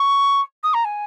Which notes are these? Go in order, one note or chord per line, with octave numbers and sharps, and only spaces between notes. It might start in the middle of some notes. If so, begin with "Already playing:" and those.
Already playing: C#6
D#6
A#5
G#5